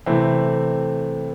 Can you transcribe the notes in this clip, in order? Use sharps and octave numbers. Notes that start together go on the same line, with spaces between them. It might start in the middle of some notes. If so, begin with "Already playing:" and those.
C3 E3 A3 C4